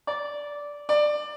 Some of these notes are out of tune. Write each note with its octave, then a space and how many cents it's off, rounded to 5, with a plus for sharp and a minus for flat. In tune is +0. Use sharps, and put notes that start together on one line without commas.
D5 -10
D5 +20